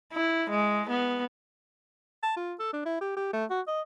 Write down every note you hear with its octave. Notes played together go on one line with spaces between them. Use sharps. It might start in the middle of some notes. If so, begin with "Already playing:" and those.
E4
G#3
B3
A5
F4
A4
D4
E4
G4
G4
A3
F#4
D#5